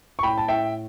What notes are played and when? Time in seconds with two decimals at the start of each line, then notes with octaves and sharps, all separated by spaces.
0.19 C#6
0.23 A2 G5 B5
0.38 A5
0.48 A2 E5 G5